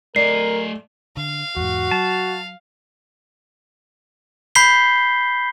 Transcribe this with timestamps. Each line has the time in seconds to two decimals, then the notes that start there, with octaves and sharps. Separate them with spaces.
0.16 A3 A#4 D5 D#5 C7
1.17 D3 F5
1.56 E2 G#2 F#4
1.91 F#3 A5
4.55 B5 G6 B6 C7 G7